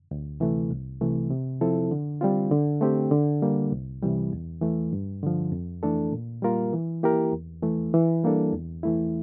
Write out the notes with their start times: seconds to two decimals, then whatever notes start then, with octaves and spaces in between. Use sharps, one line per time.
0.11 D2
0.40 C3 E3 A3
0.71 C2
1.01 C3 E3 A3
1.31 C3
1.61 F3 C4 E4 A4
1.91 D3
2.21 G3 C4 F4
2.51 D3
2.81 A3 C4 G4
3.11 D3
3.42 G3 A#3
3.72 C2
4.02 C3 E3 G3
4.33 E2
4.61 E3 A3
4.93 G2
5.23 D3 F3
5.52 F2
5.83 E3 A3 D4 A4
6.12 A#2
6.42 G3 A#3 F4 A#4
6.73 E3
7.03 A#3 E4 G4 A#4
7.33 E2
7.63 E3 A3
7.94 E3
8.24 G3 A#3 D4 A4
8.53 E2
8.83 E3 A3 E4